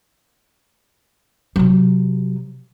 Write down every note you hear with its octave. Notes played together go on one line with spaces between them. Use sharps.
C3 F#3